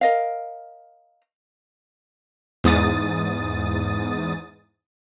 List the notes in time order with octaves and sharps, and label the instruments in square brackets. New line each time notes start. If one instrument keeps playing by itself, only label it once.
[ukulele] A#4 D#5 F5
[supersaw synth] E2 G#2 D#6 A6